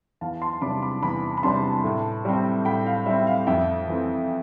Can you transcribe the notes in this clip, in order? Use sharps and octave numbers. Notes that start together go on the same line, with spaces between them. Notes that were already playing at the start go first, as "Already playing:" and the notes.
E2 F5 A5
A5 C6
C3 G3 D4 B5 D6
B5 D6
E2 B5 D6
B5
C3 G3 D4 A5 C6
A2
G3 C4
A2 G5 B5
F5
G3 C4 E5
F5
F2 E5 G5
E3 A3 C4